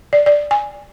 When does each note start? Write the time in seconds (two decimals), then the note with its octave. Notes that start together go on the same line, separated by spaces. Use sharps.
0.13 D5
0.26 D5
0.51 G#5